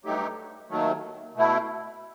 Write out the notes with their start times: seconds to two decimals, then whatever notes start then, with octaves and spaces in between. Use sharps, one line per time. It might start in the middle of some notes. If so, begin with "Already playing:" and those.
0.04 G2 F#3 A3 D#4 G4
0.70 D#2 D#3 F#3 A3
1.35 B2 A3 E4